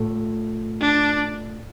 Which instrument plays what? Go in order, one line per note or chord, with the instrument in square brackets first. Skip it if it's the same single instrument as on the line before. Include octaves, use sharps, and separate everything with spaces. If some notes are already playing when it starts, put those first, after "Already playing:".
Already playing: [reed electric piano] A2 A3 F4 A4
[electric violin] D4